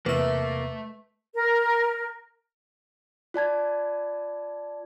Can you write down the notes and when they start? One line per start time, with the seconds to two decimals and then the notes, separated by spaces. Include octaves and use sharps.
0.06 E2 C3 A3 A#3 B4 E5 E6
1.34 A#4
3.34 F4 D5 A5 G#6